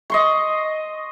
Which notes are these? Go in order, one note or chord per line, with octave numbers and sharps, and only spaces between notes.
D#5 C6 C#6